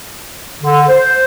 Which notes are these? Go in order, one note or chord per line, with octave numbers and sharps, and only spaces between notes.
D3
C5